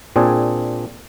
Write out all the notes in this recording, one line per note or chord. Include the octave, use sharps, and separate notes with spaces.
A#2 C4 D4 G#4